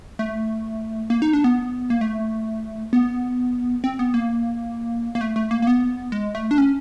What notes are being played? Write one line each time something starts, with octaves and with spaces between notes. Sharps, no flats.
A3
A#3
D#4
D4
B3
A#3
A3
B3
C4
B3
A#3
A#3
A3
A3
A#3
A#3
B3
G#3
A3
D4
C#4